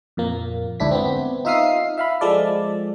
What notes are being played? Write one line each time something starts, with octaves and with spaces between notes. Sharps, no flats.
F2 A#2 A#3
D2 G#2 D4 E4 B6
B3 C4
D#4 F4 E5 F5 D#6 C7
E5 F5 B5
F3 G#3 A4 D5